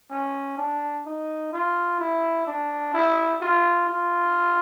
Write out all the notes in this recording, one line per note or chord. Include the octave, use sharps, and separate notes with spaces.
C#4
D4
D#4
F4
E4
D4
E4
F4
F4